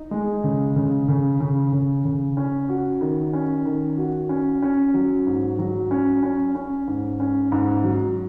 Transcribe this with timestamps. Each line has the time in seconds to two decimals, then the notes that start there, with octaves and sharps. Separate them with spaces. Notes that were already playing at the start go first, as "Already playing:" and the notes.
Already playing: D#4
0.11 G#3
0.44 C#3
0.76 C#3
1.08 C#3
1.40 C#3
1.72 C#3
2.05 C#3
2.37 C#4
2.69 F#4
3.01 D#3
3.33 C#4
3.65 D#3
3.97 F#4
4.29 C#4
4.62 C#4
4.94 F#3
5.26 G#2
5.59 F#3
5.91 C#4
6.23 C#4
6.55 C#4
6.88 G#2
7.20 C#4
7.52 G#2
7.84 F#3